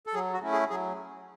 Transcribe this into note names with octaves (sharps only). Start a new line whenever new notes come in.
A4
F#3 G#4
F#4
A3 C#4 E4
G#4
F#3 G#4